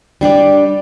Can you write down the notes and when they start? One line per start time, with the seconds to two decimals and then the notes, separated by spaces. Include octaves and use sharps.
0.21 G3 D4 G4 D5